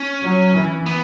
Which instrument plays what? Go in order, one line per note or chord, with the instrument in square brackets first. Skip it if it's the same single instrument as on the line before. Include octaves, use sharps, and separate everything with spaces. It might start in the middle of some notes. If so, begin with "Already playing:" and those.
Already playing: [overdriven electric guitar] C#4
[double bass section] F#3
E3
[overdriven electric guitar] B3